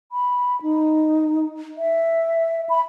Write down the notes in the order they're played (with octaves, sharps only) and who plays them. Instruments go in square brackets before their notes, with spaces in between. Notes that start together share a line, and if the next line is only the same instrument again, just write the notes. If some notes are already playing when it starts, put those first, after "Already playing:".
[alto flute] B5
D#4
E5
B5